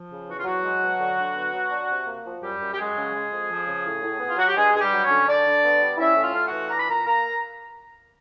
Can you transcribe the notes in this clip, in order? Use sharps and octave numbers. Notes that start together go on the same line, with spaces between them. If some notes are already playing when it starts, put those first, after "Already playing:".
Already playing: F3
C#3
E2 F#4
F4
E2 F#3 F#4
G#3
B2
D3
D3
B3
F#3
D4
C3
A#3
F3
F#2 G3 G4
F#2
G4
F#3 G#3 G#4
C#3
G#3
F2
F3
C#3
A2
A2
B3
F4
F#3 F#4
G4
G2 G#3 G#4
G2 G#4
G3 G4
F#3
C#4 C#5
D3
D3 D4 D5
D3
B3
G3
C#4 E4 E5
A2
F4 F5
A3 F5
F#4 F#5
E3
D4 A#5
B5
A#2 A#4 A#5
A#3 A#4 A#5